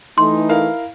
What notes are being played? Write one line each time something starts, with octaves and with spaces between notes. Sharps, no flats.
E3 A3 D#4 C6
E4 A#4 F5